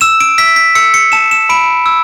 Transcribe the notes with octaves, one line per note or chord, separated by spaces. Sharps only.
E6 E7
D7
E6 B6
B6
E6 C#7
C#7
A5 E7
E7
B5 D7
E6